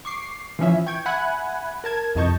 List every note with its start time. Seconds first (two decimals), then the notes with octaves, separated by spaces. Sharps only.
0.05 C#6 D6 C7
0.59 E3 F3 C#4 E5
0.86 G5 C#6 G6 G#6
1.06 E5 F#5 G#5 B5 F#6 G#6
1.84 A#4 A5 G#6
2.15 C2 F2 D#5 A5 C#6 G6